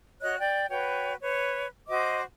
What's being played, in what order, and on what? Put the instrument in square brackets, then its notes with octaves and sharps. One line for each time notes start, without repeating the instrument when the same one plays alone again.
[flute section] F#4 C#5 D#5 F#6
D5 G5
F#4 B4 C#5 G5
B4 C#5
F#4 C5 D#5 D6